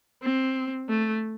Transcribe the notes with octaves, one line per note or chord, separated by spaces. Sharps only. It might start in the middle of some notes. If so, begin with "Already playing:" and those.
C4
A3